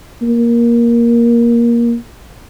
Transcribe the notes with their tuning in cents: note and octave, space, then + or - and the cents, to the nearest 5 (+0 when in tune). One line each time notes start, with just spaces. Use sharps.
A#3 +15